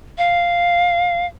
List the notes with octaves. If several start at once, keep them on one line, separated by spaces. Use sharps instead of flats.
F5